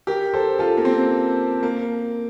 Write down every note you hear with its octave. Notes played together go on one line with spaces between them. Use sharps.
G4 A#4
A4 C5
F4 A4
A#3
C4
A#3